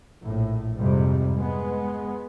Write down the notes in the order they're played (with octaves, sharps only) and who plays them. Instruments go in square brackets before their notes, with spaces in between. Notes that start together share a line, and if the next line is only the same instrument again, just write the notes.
[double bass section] A#1 A2
F2 G#2 C3 G3
G#3 B3